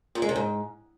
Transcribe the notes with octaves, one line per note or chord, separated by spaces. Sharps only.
A#2
G#3
C3
G#2